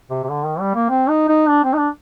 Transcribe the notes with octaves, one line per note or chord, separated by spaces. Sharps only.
C3
C3
D3
D#3
G3
A#3
C4
D#4
D#4
D4
C4
D#4
D4